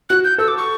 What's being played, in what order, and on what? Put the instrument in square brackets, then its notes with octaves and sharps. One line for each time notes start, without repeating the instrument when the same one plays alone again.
[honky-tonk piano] F#4 [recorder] F#6
[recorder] G6
[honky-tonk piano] A4 [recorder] E6
[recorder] D6
C#6